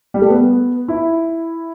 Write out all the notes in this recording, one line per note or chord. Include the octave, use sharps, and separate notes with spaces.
G3
A3
B3
E4